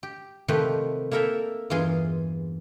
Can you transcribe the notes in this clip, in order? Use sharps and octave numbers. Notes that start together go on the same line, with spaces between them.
G4
C3 D#3 F3 A3 G4 B4
A#3 E4 A4 A#4 E5 G5
E2 G2 E3 F4 G#4 C6